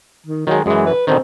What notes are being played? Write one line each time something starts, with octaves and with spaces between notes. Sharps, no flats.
D#3
D#3 F#3 G#3
F#2 E3 G#3
B4
B2 D3 D#3 C4